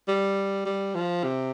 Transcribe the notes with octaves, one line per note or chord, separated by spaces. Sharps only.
G3
G3
F3
C3